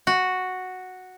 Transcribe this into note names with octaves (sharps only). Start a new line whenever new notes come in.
F#4